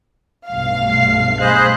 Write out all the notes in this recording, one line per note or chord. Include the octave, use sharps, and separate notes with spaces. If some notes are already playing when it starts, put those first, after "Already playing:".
B1 G2 A3 F5
C7
G#4 C5 D#5 B5 F#6